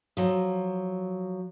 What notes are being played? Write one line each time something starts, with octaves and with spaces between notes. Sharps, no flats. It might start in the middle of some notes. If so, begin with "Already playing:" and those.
F3 F#3